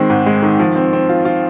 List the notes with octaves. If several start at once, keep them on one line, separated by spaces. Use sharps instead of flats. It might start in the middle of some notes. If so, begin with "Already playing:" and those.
Already playing: D#3 G#3 C4
G#2
G#3
D#3
F3
C4
C4
F4
F4